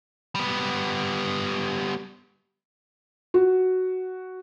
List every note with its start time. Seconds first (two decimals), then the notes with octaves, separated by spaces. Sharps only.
0.35 G3 B3
3.34 F#4